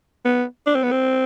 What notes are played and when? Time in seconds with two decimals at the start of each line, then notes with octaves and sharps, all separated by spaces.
0.25 B3
0.66 D4
0.75 C4
0.83 B3
0.91 C4